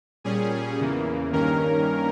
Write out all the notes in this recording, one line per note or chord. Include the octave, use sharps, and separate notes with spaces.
A#2 G3 C#4 G#4
E2 C#3 E3 A#3
G2 D#3 A#3 C#4 A#4